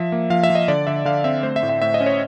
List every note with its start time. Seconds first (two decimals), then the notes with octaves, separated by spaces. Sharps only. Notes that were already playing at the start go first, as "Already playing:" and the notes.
Already playing: F3 E5
0.12 A#3
0.30 F3 F5
0.43 E5
0.50 F3
0.55 D#5
0.68 D3 D5
0.87 D3 E5
1.05 D3 F5
1.24 C4 E5
1.43 A3 C5
1.56 E5
1.63 A2
1.69 E5
1.82 A2 E5
1.94 D#5
2.01 C#4
2.06 C#5